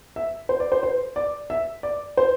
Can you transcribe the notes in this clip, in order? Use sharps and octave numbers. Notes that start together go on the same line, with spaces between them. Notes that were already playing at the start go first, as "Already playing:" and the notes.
E5
C5
D5
C5
C5
D5
E5
D5
C5